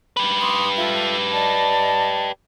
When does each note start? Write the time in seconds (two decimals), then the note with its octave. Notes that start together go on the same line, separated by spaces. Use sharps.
0.17 G4 B4
0.41 C6 D6 D#6
0.76 F4 A4 E5
1.32 D5 D#5 A5